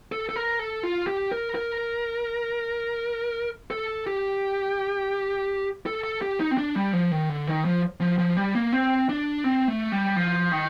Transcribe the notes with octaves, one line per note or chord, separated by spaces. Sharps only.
A4
A4
A#4
A4
F4
G4
A#4
A#4
A4
G4
A4
A4
G4
D#4
C4
D4
G3
F3
D#3
D3
D#3
F3
F3
F3
G3
A#3
C4
D4
C4
A3
G3
F3
D#3